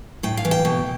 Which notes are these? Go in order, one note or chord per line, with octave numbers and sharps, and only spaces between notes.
A2 G5
F5
E3
G5
B2